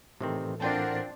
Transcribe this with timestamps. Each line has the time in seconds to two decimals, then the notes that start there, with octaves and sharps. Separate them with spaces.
0.21 A2 C3 D#3 E3 C4 A4
0.60 C4 D4 F4 A#4 F#5 G5 A5